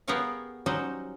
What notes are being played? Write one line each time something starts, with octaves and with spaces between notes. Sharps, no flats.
B3 G4 G#4 A#4 C#5 F5
F#3 G3 C#4 D#4 C5